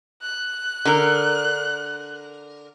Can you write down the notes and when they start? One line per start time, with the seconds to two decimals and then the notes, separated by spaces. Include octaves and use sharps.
0.22 F#6
0.85 D3 A#4